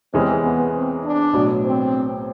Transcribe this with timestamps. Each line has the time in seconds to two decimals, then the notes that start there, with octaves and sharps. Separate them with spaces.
0.13 E2 C3 E3 G#3 C4 C#4
0.43 B3
0.74 C4
1.04 D4
1.33 B1 A2 F#3
1.64 C4